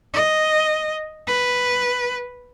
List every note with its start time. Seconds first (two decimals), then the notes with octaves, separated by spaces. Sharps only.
0.14 D#5
1.27 B4